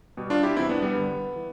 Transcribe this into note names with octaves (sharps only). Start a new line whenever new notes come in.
B2 G3
D4 F4
E4 G4
E2 B2 G3 C4 E4
B3 D4
G3 B3
G2 D3 G3
E3